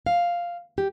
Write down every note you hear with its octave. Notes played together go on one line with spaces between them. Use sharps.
F5
G4